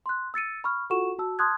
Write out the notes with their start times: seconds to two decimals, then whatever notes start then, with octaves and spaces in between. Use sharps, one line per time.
0.06 C6 F#6
0.34 E6 A6 C#7 D#7
0.64 B5 C#6 F6
0.90 F4 F#4 A4 F#5 C#6 E7
1.19 F#4 A5 E6
1.39 A5 C6 D#6 F6 F#6 G#6